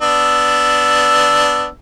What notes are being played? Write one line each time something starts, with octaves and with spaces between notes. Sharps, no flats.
B3 D4 E6